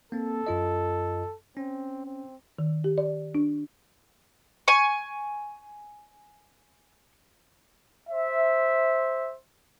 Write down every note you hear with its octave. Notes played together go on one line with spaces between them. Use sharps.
A#3 C4 A4
F#2 F4 D#5
C4 C#4
C4
D#3
G4
D5
D4
G#5 C#6
C5 E5